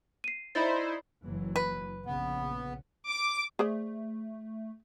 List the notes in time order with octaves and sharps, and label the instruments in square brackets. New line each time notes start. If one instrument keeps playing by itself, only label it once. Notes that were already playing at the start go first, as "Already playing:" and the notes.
[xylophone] C7 D#7
[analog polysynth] D#4 E4 C5 [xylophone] D5 B5 A6
[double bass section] F#1 E3 F#3
[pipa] B4
[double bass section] A#1 C#3 [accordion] B3
[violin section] D6
[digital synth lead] A3 [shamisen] G#4 C5 D5